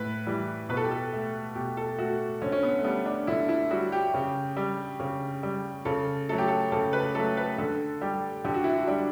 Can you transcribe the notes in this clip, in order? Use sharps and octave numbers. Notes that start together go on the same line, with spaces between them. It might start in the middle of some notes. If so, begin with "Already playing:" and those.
Already playing: A2 B4
E3 G3
B2 B4
A4
G4
A4
A3
B2 G4
A4
A3 F#4
D3 C#4
C#4
B3
A3
G3 B3
D4
D3 E4
E4
G3 F#4
G4
C#3
G3
C#3
G3
C#3 A4
F#3 A3 A4
G4
A4
C#3 A4
B4
F#3 A3 A4
B4
D3 A4
G3 G4
D3 G4
F#4
E4
F#4
G3 D4